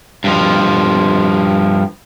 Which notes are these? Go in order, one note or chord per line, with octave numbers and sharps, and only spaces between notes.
G2 F3